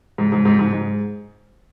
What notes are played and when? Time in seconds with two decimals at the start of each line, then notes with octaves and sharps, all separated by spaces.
0.18 G#2
0.32 G#2
0.45 G#2
0.59 G#2
0.73 G#2